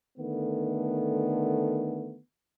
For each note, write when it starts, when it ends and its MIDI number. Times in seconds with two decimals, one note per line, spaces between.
0.18 2.19 50
0.18 2.19 51
0.18 2.19 57
0.18 2.19 59